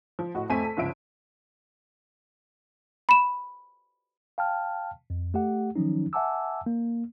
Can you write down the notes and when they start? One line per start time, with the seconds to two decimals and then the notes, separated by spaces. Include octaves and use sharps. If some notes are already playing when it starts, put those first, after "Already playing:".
0.19 F3
0.35 A2 F#4 D#5
0.50 F2 A3 C4 G#5 B6 D#7
0.64 A4
0.77 G1 C#2 F3 E5 D7
3.09 B5 E7
4.38 F5 G5 A5 F6
5.10 F2
5.34 A3 G4 F#5
5.76 D#3 F3 F#3 C#4 D#4
6.13 E5 F#5 G#5 A5 D6 E6
6.66 A#3